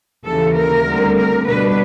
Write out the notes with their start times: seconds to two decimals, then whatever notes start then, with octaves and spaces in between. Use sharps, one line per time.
0.24 D#2 C#3 E3 A4
0.55 A#4
0.85 D2 D3 G3 C4
1.16 A#4
1.46 B2 G3 B3 D4 B4